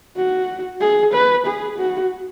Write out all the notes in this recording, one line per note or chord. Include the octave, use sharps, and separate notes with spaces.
F#4
G#4
B4
G#4
F#4